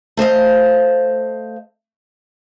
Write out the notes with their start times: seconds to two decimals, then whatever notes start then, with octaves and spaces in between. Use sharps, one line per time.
0.17 A3 C5 D#5 F5